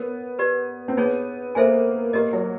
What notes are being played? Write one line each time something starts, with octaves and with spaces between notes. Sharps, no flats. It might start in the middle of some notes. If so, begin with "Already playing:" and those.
Already playing: B3 A#4 C#5
G4 B4 D5
C4
B3 D#4 G#4 C#5
A#3 A4 C5 E5 G#5
A#3 G4 A#4 D#5
F#3